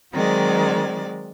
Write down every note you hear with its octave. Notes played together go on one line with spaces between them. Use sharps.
D#3 F#3 G#3 C4 D5